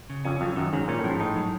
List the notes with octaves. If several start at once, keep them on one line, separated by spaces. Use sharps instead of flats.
C#3
F2 C#4
F2 F#3
F#2 D#3
G#2 F#3
A#2 C#4
A2
F3
G#2
A2 D#4
F#3